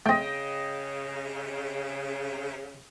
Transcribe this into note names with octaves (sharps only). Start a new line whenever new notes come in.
C#3 A3 C4 D#5 G5